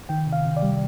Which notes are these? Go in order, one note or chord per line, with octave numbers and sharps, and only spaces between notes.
D#3 G5
C3
F5
C3
D5
G3